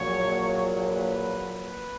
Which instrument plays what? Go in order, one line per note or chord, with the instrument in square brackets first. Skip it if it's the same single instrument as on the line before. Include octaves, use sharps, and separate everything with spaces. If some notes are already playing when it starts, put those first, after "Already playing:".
Already playing: [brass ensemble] A#1 A#2 F#3 C#5
B4
B4